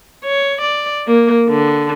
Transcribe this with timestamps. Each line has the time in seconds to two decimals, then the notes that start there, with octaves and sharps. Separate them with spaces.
0.25 C#5
0.61 D5
1.07 A#3
1.49 D3